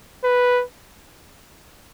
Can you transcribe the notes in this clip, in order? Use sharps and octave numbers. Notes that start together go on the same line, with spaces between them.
B4